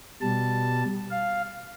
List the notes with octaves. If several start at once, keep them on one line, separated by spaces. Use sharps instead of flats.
B2 G3 A5
F5